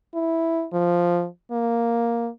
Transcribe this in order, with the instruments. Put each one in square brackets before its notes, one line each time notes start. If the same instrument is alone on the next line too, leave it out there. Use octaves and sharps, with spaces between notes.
[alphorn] E4
F3
A#3